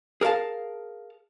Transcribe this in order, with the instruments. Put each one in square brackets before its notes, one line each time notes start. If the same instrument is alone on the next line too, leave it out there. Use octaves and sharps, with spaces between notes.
[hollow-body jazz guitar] G#4 A#4 D5 F5 A5